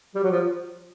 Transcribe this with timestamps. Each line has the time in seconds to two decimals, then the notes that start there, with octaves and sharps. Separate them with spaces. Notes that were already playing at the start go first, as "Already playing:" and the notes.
0.15 G3
0.23 F#3
0.31 F3